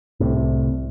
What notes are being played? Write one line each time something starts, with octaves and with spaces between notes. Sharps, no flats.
C2 A2 C3